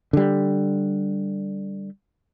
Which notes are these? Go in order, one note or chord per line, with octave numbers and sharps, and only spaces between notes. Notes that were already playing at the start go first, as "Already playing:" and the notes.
D3 G3